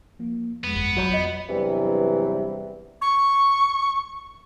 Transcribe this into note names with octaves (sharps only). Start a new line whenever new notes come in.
F3 A#3
F2 G#3 B3
G1
B1 F#3 F4 C#5 B5
F2 D#5
E2 G2 C3 E3 F#3 G3
C#6